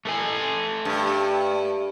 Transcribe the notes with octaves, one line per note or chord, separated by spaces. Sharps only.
A3 A4 G#5
G2